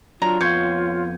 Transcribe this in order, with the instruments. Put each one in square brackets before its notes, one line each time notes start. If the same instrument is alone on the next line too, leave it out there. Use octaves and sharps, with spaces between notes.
[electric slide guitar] F#3 D4 [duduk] F4 [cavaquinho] A#5
[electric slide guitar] F2 B3 F5 [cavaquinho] C#5 C6 [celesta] G6 G#6